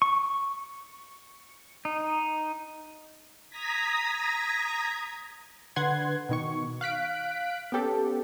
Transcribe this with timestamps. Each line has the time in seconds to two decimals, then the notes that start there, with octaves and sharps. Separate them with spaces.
0.02 C#6
1.85 D#4
3.49 A#5 D#6 G#6 A#6 B6
5.76 D3 B4 F#5 C6 G#6
6.29 B2 D#3 C#6
6.81 F5 F#6 B6 D7
7.72 B3 C#4 G4 A4